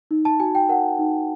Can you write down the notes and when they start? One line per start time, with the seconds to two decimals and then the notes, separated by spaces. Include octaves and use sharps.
0.11 D#4
0.25 A5
0.40 F#4 G#5
0.55 G5
0.69 A#4 F#5
0.99 D#4